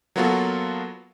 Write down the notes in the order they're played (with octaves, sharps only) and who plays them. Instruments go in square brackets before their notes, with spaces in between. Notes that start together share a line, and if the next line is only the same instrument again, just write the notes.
[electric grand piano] F#3 A#3 B3 F4 F#4 A4